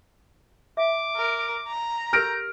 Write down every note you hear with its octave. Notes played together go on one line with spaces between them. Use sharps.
E5 F5 D6
A#4
A#5
G4 A#4 F6 G6 A#6 D7